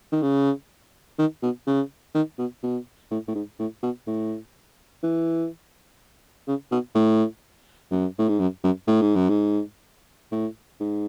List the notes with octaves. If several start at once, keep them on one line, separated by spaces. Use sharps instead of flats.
D#3
C#3
D#3
B2
C#3
D#3
B2
B2
A2
A2
G#2
A2
B2
A2
E3
C#3
B2
A2
F#2
A2
G#2
F#2
F#2
A2
G#2
F#2
G#2
A2
G#2